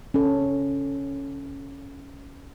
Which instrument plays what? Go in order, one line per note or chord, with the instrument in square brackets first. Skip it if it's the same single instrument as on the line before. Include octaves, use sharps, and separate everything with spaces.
[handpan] C#4 A4